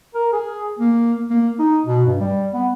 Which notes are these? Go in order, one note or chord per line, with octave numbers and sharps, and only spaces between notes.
A#4
G#4
A#3
A#3
D#4
B2
G2
G3
B3